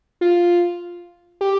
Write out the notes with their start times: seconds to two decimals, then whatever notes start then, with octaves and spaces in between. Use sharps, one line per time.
0.21 F4
1.41 G4